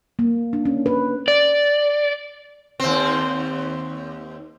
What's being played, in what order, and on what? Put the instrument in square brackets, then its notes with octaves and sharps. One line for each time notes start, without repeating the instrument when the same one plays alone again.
[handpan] A#3
D4
C#4
B4
[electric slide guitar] D5
[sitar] D#2 C4